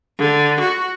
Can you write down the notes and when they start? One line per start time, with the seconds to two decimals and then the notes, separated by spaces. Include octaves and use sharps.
0.19 D3
0.61 F#4